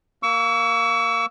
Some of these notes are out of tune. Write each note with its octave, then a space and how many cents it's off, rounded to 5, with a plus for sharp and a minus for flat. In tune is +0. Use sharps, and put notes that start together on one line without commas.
A#3 +0 C#6 +35 E6 +0